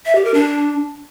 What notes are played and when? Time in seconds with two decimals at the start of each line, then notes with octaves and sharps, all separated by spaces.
0.06 E5
0.15 G4
0.25 A#4
0.34 D4